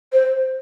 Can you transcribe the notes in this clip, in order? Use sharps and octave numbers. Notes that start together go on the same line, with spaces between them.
C5